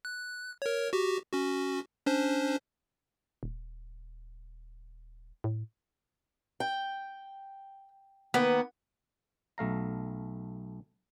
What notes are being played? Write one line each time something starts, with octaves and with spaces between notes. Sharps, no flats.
F#6
A#4 C#5
F#4 G4
C#4 F#4
C#4 D4 C5
D#1
A2
G5
D#3 A#3 B3 B4
B1 A3 F5 A#5